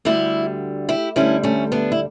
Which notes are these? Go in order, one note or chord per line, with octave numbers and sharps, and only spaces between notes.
D2 D3 G3 E4 G4
E4 G4
D2 D3 G3 C#4 E4
A3 C#4
B3 D4
E4